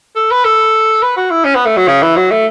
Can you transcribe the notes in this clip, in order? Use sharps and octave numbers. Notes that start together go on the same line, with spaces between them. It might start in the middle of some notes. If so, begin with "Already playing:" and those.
A4
B4
A4
B4
F#4
E4
C#4
B3
A3
F#3
C#3
E3
F#3
A3